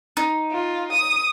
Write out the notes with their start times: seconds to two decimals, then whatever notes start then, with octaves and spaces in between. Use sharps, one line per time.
0.17 D#4
0.51 F4
0.92 D#6